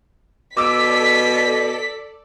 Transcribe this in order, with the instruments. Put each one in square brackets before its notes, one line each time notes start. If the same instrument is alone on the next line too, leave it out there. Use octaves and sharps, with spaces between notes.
[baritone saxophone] B2 [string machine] A4 D5 [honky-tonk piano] D6 E6 D7 [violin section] B6